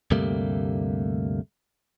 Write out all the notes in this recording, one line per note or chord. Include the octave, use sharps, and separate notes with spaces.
D2 G2 C3 G3 A3 A#3